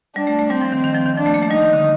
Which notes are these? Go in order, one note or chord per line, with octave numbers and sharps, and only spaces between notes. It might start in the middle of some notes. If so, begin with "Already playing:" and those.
G3 D4
A3
A3
G3 C4
F3
D#3
D#3
F3
D#3
F3 D4
A3
A#3
A3
G3 D#4
D#3
D3